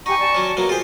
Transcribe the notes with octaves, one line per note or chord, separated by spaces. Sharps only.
D#4 G4 F#5 G#5 C#6
D5 G#5 A5
F#3 C#4
B2 F#3 A#3
F4 G4 G#4 C5